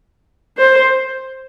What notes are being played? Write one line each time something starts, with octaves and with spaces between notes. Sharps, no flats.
C5